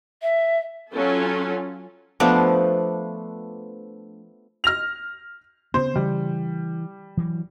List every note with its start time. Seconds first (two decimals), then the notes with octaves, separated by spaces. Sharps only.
0.22 E5
0.93 F#3 C#4 F4 A4
2.20 F3 A3 B3 D4
4.64 F6 A#6 F7
5.74 C#3 B3 C4 C5
5.96 C#3 E3 G3
7.17 E3 F#3